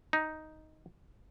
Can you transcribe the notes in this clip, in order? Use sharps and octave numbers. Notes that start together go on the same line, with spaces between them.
D#4